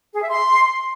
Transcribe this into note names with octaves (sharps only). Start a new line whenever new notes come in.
G#4
E5
C6